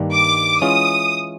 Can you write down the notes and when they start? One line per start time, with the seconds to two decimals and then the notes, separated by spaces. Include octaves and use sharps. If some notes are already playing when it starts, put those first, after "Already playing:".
Already playing: G2 D#3 G3 A#3 D4
0.12 D6
0.62 E3 G#3 C#4 F4 D#6